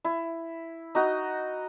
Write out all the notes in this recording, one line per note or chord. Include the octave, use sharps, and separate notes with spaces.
E4
D#4 F#4 D#5